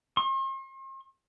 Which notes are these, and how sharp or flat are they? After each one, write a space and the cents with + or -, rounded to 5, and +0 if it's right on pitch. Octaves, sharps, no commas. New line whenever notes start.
C6 +45